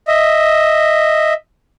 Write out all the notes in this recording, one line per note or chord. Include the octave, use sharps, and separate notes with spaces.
D#5 E5